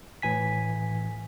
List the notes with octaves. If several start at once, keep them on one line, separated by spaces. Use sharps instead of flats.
A2 E3 G#5 B6